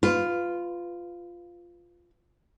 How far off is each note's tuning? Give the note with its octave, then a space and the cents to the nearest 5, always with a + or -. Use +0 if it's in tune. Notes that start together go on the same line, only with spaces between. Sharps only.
F4 +0 B4 +25